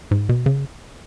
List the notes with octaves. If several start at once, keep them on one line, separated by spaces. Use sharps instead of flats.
G#2
B2
C#3